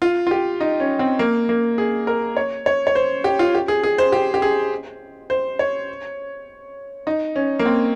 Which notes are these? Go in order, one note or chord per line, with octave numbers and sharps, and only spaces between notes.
F4
F4
G4
D#4
C#4
C4
A#3
A#3
G#4
A#4
C#5
C#5
C#5
C5
G4
F4
G4
G#4
G#4
C5
G4
G4
G#4
C5
C#5
D#4
C#4
A#3
C4